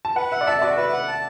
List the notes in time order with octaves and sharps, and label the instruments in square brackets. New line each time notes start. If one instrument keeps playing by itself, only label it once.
[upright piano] A5
[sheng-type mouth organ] B4 [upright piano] F#5
[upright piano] E5 [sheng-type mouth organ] F#5
[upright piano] D5
[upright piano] E5 [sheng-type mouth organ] A5
[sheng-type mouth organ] F#4 [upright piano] D5
[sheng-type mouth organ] B4 [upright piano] E5
[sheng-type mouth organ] F#5
A5